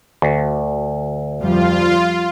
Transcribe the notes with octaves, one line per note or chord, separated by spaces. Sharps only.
D2
F2 F3 G3 F4